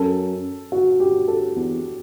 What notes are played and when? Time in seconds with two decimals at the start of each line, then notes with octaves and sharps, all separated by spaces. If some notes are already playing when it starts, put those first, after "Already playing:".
Already playing: F#2 A4
0.72 F#4
1.00 G4
1.28 A4
1.56 E2